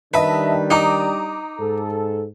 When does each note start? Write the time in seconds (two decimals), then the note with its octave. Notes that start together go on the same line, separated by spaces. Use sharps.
0.14 D#3 G3 D4 B4 D#5 E5 A5
0.70 D#4 A#5 D6 D#6
1.60 G#2 A4